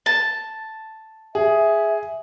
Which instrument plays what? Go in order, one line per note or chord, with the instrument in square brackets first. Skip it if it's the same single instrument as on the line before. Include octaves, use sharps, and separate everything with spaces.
[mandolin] A5
[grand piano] G#4 [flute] E5